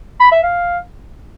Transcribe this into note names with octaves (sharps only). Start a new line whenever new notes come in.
B5
E5
F5